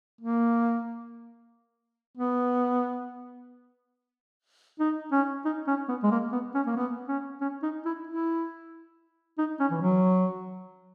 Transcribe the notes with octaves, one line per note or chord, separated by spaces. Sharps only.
A#3
B3
D#4
C#4
D#4
C#4
B3
G#3
A#3
B3
C#4
A#3
B3
C#4
C#4
D#4
E4
E4
D#4
C#4
E3
F#3